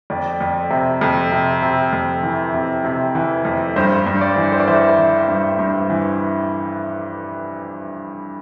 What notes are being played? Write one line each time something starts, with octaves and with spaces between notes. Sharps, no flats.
F2 D5
F2
C3
F2
C3
C3
F2
E3
C3
C3
E3
F2
G2 C5
G2
D5
E3
C5
D5
E3 C5 E5
E3
G2
G2
E3